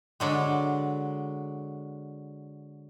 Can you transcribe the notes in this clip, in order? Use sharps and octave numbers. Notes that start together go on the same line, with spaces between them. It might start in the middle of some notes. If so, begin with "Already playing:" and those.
D3 F#3 G#3